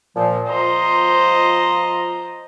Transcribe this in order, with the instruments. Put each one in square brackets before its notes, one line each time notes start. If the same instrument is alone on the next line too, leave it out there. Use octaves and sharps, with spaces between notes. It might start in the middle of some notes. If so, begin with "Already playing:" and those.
[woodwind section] A#2 F3
[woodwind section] F3 F4 A#5 [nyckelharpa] C5 D#5